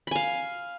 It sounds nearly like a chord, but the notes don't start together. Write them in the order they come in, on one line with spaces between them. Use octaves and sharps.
B5 G#5 F5